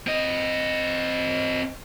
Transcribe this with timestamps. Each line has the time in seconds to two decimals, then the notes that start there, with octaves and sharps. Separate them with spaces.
0.07 C4 D#5